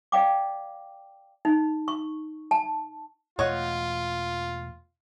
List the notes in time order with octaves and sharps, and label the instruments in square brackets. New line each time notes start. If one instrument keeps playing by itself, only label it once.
[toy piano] D5 F5 G5 D6
D#4
C#6
A5
[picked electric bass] E2 B2 A3 [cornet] F4 [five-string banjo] C#5 D#5 F#5